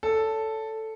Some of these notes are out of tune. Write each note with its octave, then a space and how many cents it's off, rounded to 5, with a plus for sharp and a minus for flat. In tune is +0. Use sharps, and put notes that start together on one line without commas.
A4 +0 C#5 +35